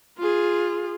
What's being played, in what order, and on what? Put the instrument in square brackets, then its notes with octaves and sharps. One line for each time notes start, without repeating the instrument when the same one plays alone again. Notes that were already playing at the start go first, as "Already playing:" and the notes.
[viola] F4 G#4